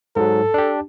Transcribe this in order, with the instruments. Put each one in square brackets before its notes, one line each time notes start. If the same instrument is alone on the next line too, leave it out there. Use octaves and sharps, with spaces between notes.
[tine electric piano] G#2 F#3 [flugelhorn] A4
[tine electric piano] D4 G4